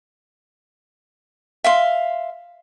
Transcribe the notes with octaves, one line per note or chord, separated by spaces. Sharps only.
E5 F5 C6